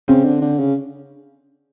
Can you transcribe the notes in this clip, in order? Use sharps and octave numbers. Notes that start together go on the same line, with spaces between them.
C#3 C4
D3
D3
C#3